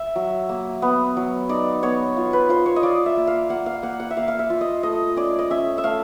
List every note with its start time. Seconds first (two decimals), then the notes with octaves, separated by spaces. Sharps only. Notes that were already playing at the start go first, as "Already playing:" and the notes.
Already playing: E5
0.16 F#3
0.49 A#3
0.82 B3
1.17 F#3
1.49 D#4 D5
1.83 B3 C#5
2.17 F4
2.33 B4
2.49 F4 C5
2.66 C#5
2.76 D#5
2.83 F4 D5
3.06 E5
3.17 A#3
3.27 F5
3.49 A#3 F#5
3.66 F5
3.83 A#3 F#5
4.00 F#5
4.11 E5
4.17 A#3 F5
4.28 F5
4.39 E5
4.50 F4
4.61 D#5
4.83 A3 D#5
5.16 C#4 D5
5.39 D#5
5.50 C#4 E5
5.78 E5
5.84 A3 F5